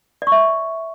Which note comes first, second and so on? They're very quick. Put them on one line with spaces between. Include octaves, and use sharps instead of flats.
D5 C#6 E5